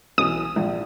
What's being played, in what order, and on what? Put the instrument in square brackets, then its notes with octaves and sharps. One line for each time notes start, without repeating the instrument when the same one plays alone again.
[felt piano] B1 E3 [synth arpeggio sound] D#6
[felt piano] A#1 F3